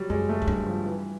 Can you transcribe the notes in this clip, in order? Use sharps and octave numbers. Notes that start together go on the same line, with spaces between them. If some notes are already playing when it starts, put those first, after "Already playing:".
Already playing: F#3 G3
F#2 G#3
A3
G#2
G2 A3
F3
E3